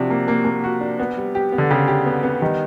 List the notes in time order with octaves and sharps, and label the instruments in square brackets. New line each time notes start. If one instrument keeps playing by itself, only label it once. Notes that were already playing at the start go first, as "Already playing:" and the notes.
Already playing: [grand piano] C3 [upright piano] F3 D4 F#4
[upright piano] A#3
A#3
A#3
F#4
D4
B3
G3
G4
B3
[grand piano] D3
[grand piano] C#3 [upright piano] G4
[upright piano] G4
B3
B3
[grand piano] D#3 [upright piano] G3